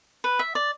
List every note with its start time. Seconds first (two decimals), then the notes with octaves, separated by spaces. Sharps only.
0.24 B4
0.39 E5
0.55 D5